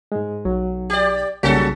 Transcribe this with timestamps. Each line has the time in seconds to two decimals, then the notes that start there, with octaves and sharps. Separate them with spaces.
0.12 G#2 G#3
0.45 B1 F#3
0.90 G4 D5
1.43 B1 C#3 G3 A#3 C#4 F#4 A4 B6